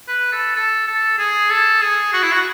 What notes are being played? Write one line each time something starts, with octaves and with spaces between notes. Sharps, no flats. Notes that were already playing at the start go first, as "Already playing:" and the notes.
B4
A4
A4
A4
G#4
A4
G#4
F#4
E4
F#4